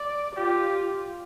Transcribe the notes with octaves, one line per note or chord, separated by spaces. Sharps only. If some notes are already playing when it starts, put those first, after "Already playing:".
Already playing: D5
F4 G4